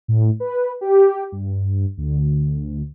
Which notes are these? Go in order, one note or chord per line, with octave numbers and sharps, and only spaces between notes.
A2
B4
G4
G2
D2